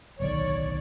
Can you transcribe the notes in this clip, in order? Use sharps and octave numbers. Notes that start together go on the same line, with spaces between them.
D1 B1 D#3 C#5 D5